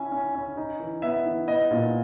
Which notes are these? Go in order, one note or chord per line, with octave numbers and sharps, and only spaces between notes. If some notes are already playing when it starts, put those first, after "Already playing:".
Already playing: C#4 E4 G#5
C#4
C#4
D#4
E3
B3 E5
E3
B3 D#5
A#2